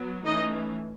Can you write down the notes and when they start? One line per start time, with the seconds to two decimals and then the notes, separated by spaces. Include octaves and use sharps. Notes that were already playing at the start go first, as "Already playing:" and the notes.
Already playing: F#3 B3
0.25 E3 A3 C#4 D#4 D#5